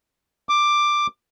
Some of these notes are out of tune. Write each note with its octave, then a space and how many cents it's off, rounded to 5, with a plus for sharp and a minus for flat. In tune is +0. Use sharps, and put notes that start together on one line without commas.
D6 +10